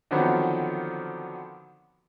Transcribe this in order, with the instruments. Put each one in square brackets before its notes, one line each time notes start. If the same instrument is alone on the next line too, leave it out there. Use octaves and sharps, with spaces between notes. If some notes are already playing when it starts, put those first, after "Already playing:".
[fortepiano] D3 D#3 F3 F#3 B3 C4